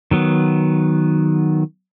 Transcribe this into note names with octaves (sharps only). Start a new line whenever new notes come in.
D#3 F#3 B3